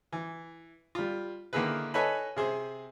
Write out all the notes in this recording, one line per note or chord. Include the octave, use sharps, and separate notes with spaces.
E3
G3 F4
D3 D#3 A#3 E4 G#4 B4
A4 B4 C#5 D#5 G#5 B5
C3 G#4 C5